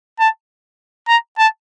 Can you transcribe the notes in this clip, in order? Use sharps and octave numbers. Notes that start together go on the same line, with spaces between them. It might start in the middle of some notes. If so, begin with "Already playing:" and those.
A5
A#5
A5